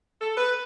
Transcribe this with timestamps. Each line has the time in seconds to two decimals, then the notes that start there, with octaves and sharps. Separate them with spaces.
0.21 A4
0.36 B4